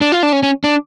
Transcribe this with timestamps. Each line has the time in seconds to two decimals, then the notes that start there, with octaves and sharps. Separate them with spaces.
0.01 D4
0.12 F4
0.23 D4
0.33 C#4
0.43 C#4
0.64 D4